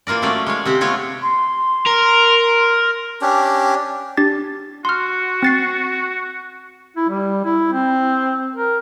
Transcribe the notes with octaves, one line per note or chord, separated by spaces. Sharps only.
E3 A#3 F4 A#4 D5
F#3 A3 C#4 D5
G#3 C#5 F5
C3 C4 G4
A3 B3 F4 C#5 F5
C6
A#4
C#4 D4 G4
D4 G4 A6
F#4 C6 F6
C4 A6 C7
E4
G3
E4
C4
A#4